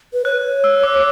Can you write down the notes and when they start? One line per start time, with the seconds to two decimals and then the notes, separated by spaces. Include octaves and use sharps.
0.13 B4
0.25 C#5 F#6
0.64 E6
0.83 D6